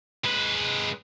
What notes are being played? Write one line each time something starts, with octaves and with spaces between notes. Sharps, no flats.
G#3 B4